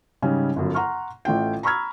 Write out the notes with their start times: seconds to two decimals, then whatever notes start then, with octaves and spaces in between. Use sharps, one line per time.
0.22 G#2 C#3 G3 C#4
0.56 G1 F#2
0.74 F#5 A#5 C6 C#6 F6
1.25 A1 A3 F4 G5
1.63 A#5 B5 C#6 E6 F6 G#6